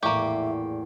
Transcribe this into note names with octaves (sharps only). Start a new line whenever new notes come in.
A#1 E2 A2 A#3 G4 E5 C#6